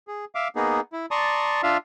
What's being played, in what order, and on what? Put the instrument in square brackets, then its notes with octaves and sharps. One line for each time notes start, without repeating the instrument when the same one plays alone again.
[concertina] G#4
E5 F5 D6
A#3 B3 D#4 G#4
E4
D5 A5 A#5 C6 C#6 D#6
D4 F4 E5 F5